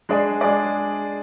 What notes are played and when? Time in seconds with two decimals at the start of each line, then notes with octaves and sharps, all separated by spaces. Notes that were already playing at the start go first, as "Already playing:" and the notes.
0.09 G#3 D4 G#4 D5
0.41 G#3 D4 G#4 D5